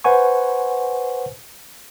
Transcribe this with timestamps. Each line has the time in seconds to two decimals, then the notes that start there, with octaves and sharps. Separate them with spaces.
0.04 B4 C5 F#5 G#5 C#6